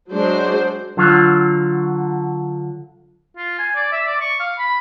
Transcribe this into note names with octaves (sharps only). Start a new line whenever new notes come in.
F#3 G#3 D4 C5
D3 F#3 F4
F4
G#5
D5
E5
D5
C#6
F5
B5